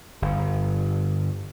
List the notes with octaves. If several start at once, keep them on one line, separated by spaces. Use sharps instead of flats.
G1